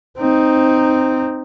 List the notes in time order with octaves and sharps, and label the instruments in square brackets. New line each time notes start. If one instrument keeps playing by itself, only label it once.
[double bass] C4 D#4